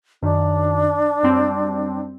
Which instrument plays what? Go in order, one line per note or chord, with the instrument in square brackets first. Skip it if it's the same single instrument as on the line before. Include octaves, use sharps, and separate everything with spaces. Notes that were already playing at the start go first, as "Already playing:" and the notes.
[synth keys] F#2 D#3 [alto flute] D4
[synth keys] F#2 G3 C4